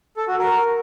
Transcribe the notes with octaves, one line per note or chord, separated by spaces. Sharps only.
A4
F#4
A#4